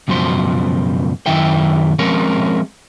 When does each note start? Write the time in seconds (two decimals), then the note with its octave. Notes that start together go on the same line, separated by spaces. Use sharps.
0.08 C#2 F#2 B2 F3 C5
1.26 F#2 D#3 E4 E5 G5
1.99 F3 G#3 C4 C#4 A#4 C#5